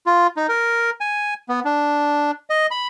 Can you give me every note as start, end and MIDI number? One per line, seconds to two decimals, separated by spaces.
0.06 0.27 65
0.37 0.47 63
0.49 0.90 70
1.01 1.34 80
1.49 1.60 59
1.65 2.31 62
2.50 2.67 75
2.71 2.88 83